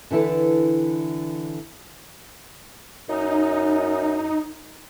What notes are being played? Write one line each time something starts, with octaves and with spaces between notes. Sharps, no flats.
D3 E3 E4 A4 B4
F#2 D#4